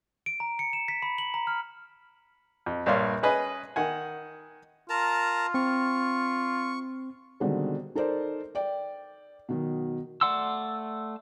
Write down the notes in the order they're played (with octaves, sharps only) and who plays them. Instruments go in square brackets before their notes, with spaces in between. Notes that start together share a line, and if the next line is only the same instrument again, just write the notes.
[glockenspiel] D7
A#5
C#7
E7
B6
B5
F#7
A#5
F6
[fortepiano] F2
A#1 G2 C#5 D5 F5 C6
C#4 G#4 B4 D#5 G#5
D#3 F#5 G#5
[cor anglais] F4 [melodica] A#4 A5 A#5
[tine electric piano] C4 [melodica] C#6
[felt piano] B2 D3 D#3 G3 G#3 C4
D#4 A4 A#4 C5 D5
D5 G5
B2 D#3 F#3
[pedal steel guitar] A3 D5 F#5 C6 E6